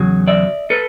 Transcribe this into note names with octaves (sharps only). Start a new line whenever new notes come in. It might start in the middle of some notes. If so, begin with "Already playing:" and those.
Already playing: E2 C#3 F#3
D5 E5
A4 B4